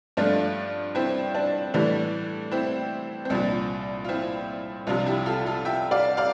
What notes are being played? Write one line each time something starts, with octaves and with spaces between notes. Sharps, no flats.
G2 F3 A3 D4 F4
C4 E4
D4
A2 E3 G3 D4
C4 E4
C4
C2 A#2 F3 D4
F4
C4 E4
C2 C3 F3 D4 F4
E4 G4
F4 A4
F4 A4
E5 G5
D5 F5
D5 F5